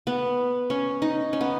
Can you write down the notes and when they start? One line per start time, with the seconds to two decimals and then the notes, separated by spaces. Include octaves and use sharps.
0.07 B3
0.70 C#4
1.02 D#4
1.33 C#4
1.41 B3